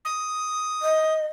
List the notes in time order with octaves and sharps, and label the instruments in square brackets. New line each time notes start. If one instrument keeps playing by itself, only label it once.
[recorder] D#6
[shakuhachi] D#5